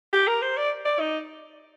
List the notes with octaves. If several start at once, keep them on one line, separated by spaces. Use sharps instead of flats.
G4
A#4
C5
D5
D5
D#4